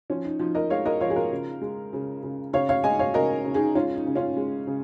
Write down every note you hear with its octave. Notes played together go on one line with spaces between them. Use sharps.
F3 C#4
D#4
F3 D#4
A#4 D#5
G#3 C#5 F5
A#4 D#5
F3 C#5 F5
G#4
F4 A#4
C#3
G#3
C#3
C#3
C#3 C#5 F5
C#5 F5
G#3 D#5 G#5
C#5 F5
C#3 A#4 D#5
C#3
D#4 G#4
G#3 C#4 F4
D#4
C#3
C#4 F4
G#3
C#3